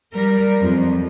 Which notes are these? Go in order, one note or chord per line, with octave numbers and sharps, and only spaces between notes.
G3 A#4
F2